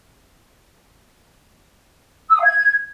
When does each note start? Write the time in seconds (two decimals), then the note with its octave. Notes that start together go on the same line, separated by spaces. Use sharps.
2.29 E6
2.34 D#6
2.39 F5
2.44 G#6